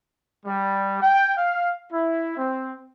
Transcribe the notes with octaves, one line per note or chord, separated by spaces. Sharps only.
G3
G5
F5
E4
C4